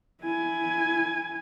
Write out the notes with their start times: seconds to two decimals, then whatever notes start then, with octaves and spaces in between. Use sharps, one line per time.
0.22 E4 G#5